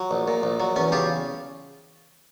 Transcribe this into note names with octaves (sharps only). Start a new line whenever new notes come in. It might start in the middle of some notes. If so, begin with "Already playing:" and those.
Already playing: F#3
A#1
A#2
A#1
F#3
E2 C#4
C#3 F4 G4